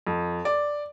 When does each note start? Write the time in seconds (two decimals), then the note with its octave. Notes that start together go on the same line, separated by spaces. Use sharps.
0.07 F2
0.45 D5